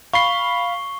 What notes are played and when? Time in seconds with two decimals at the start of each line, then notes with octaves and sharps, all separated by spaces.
0.13 F5 B5 C#6 C7 G7